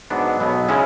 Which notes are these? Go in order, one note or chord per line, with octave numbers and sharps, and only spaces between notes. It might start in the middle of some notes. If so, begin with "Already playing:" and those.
G#2 F#3 B3 D4
B1 B2 F#3 B3
C#3 G#3 C#4 E4